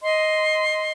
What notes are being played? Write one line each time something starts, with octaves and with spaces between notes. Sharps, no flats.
D#5 C6